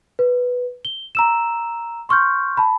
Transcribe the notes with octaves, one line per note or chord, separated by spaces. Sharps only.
B4
G7
A#5 E6 E7
C6 C#6 F6 G6
A5 B5